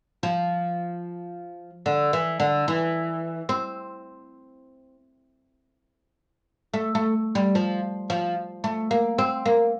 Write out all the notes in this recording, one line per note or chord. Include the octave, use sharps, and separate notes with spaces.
F3
D3
E3
D3
E3
C4
A3
A3
G3
F3
F3
A3
A#3
C4
A#3